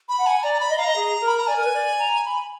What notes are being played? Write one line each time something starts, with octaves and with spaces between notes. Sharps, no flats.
B5
F#5
G#5
D5 A#5
A#5
B5
D#5
F5 A#5
D#5
G#4
A#4
B5
A#5
D5 G#5
A#4
B4
D5
A#5
B5